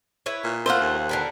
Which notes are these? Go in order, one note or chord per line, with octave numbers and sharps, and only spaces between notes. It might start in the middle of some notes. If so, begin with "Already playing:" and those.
E4 B4 C#5
A#2
A3 A#3 F4 C5 F#5
D#2
D3 A#4 B4